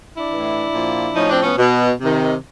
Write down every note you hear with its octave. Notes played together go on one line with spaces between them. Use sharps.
D4 E4
A2 E3
A#2 F3
A2 F3 C#4 D#4
C4 D4
B3 C#4
B2
C3 D#3